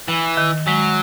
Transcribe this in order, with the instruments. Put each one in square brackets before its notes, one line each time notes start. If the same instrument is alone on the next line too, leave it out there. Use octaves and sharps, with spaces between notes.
[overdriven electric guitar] E3
[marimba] D#3
[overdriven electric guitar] F#3 [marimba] G#3